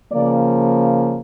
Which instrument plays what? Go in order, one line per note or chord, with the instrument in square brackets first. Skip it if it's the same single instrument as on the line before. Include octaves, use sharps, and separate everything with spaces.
[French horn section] C#3 F3 A#3 D5